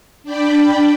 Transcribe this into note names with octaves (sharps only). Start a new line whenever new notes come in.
D4 D5 G5 B5